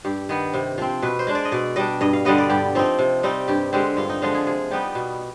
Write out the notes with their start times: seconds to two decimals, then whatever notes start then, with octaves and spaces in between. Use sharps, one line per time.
0.04 G2 G4
0.29 D#3 B3
0.54 C3
0.78 F3 C4
1.02 B2 B4
1.19 C5
1.27 G#3 D4
1.35 D5
1.45 D#5
1.52 B2 D5
1.76 G3 D4 D#5
2.01 G2 D#5
2.13 F5
2.25 D3 G3 B3 D#5
2.38 D5
2.50 G2 G4
2.75 F3 C4 D#4
2.99 C3
3.23 G3 C4 D#4
3.48 G2 G4
3.73 D3 G#3 C4 G4
3.97 G2 F4
4.09 D#4
4.22 D3 F3 G#3 F4
4.34 G#4
4.47 C3 G#4
4.71 G3 B3 D#4 G4
4.95 B2